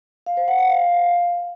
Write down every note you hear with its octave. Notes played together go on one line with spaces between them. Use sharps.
F5
C5
F#5
G5
F5